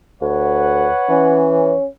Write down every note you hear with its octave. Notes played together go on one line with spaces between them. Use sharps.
D2 B4 C#5 F#5
E3 C#4